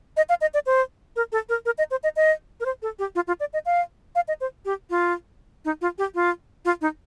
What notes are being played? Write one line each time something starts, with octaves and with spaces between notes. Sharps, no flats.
D#5
F5
D#5
D5
C5
A#4
A4
A#4
A#4
D#5
C5
D#5
D#5
A#4
C5
A4
G4
F4
F4
D5
D#5
F5
F5
D#5
C5
G4
F4
D#4
F4
G4
F4
F4
D#4